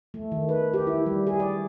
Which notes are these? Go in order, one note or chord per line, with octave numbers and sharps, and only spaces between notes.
A3
D#3
B4
G4
E4
G3
G#4
D5